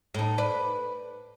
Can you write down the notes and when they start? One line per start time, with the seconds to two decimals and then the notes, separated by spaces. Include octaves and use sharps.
0.14 A2 D#4
0.38 B4 D5